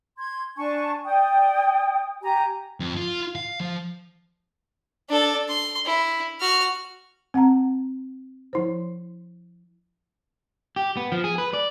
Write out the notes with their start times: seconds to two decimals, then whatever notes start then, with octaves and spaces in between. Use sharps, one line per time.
0.18 C6 G#6
0.57 D4 G#5 A5 C#6
1.05 D5 G5 D#6
2.22 G4 G#5 A#5
2.80 F2
2.97 F4
3.35 F5
3.60 F3
5.09 D4 A4
5.48 C6
5.85 E4
6.40 F#4 F6
7.34 C4 F#5 A5 A#5
8.53 F3 E4 C5
10.76 G4
10.97 B3
11.12 F3
11.24 G#4
11.38 B4
11.53 D5